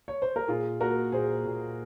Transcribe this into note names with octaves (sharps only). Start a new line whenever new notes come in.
C#5
C5
A#4
A#2 F4 G#4
A#3 F#4 A#4
A#2 G#4 C5
A#2